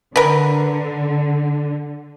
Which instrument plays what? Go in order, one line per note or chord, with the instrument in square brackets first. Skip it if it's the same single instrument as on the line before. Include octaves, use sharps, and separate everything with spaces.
[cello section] D3 [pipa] A#4 B4